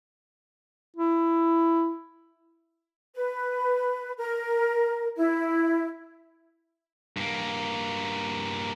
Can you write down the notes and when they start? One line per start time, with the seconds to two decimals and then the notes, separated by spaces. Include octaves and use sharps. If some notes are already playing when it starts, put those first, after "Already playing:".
0.96 E4
3.15 B4
4.18 A#4
5.17 E4
7.17 G2 A#3